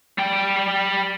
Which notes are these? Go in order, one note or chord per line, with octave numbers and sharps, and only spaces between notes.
G3 G5